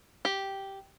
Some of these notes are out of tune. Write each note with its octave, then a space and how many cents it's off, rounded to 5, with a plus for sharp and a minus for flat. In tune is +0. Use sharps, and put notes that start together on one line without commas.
G4 -5